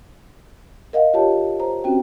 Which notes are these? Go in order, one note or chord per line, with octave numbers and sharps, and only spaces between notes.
A#4 D#5 F5 F#5
F4 G4 C#5 A5
C5 A#5
C4 C#4 F#4 G5